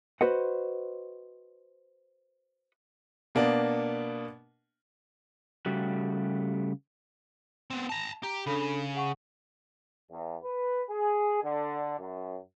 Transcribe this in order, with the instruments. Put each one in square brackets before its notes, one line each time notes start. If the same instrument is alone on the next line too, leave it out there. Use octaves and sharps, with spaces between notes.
[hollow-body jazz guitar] F#4 B4 C5 D#5 F#5
[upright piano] B2 A#3 B3 D4
[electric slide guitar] C#3 G3 A3 F#4 G4
[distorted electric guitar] B3 C4
A5 A#5
[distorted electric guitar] G4 [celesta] A#5
[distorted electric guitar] C#3 [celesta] D4 A4 B5
[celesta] G#4 F#5 C#6
[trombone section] E2
B4
G#4
D3
F#2